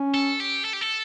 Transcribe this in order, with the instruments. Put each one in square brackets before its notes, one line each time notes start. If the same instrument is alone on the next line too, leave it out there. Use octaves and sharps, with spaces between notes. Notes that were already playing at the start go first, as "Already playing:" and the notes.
Already playing: [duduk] C#4
[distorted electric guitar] A4
G4
A4
G4
A4